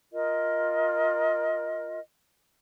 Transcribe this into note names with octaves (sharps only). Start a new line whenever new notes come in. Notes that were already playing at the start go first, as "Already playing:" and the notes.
F4 A#4 D#5